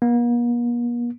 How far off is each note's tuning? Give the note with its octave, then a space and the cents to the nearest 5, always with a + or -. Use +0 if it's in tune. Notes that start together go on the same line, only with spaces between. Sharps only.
A#3 +45